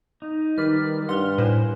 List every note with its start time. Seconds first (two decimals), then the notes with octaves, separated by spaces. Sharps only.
0.22 D#4
0.58 D#3 G3 B4 D5 F6
1.09 G2 F#5 C6 F6
1.38 A2 B4 C5 G#5